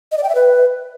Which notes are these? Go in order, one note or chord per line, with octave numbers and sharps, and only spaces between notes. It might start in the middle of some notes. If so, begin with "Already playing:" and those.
D#5
D5
G5
E5
B4